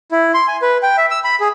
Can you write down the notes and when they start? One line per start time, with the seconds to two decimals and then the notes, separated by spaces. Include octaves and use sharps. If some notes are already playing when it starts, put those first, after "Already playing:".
0.11 E4
0.34 C6
0.48 G#5
0.62 B4
0.83 G5
0.97 E5
1.11 E6
1.24 B5
1.40 G#4